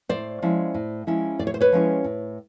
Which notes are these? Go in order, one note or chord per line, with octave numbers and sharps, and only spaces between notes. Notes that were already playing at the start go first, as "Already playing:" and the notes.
A2 C5 D5
F3 G#3 C#4 E4
A2
F3 G#3 C#4 E4
A2 D5
C#5
C5
B4 C#5
F3 G#3 C#4 E4
A2